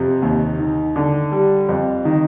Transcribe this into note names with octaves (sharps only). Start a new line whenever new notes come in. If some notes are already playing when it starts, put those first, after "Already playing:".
Already playing: F2 C3
D#2
D#3
D3
G3
F2
D#3